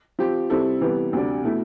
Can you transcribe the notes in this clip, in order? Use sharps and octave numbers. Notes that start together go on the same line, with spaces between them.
F3 C4 G4
C3 G3 C4 E4 A4
C3 E3 G3 B3
D2 C3 G3 D4
B2 A3 E4